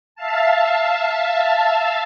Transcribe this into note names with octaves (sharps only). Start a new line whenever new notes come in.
E5 F5 A5